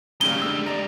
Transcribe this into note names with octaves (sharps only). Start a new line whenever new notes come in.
F#2 C#3 G3 G#3 A#3 G7
D3 E6
D5 A#5